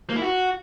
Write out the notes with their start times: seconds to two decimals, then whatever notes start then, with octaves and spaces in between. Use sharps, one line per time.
0.10 A#3
0.16 E4
0.22 F#4